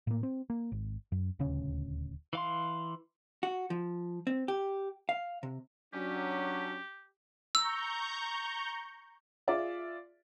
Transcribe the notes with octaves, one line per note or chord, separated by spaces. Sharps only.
A2 A#3
C4
A#3
G#1
F#2
D#1 D2 C#3 C#4
E3 F5 C6
F#4
F3
C4
G4
F5
C3
F#3 C#4 D4 G4
A#5 C#6 E6 G6
F4 G#4 D5 E5